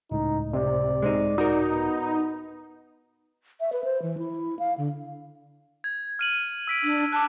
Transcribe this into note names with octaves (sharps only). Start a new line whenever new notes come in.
C#2 A2 D#4
C3 D5
G#3 C4 D#4
D#4 F#4 A#4
B3
E5
B4
C5
E3
E4
F5
D3
G#6
F6 D#7 F#7
E6 B6 D7
D4
A5 D6 F#6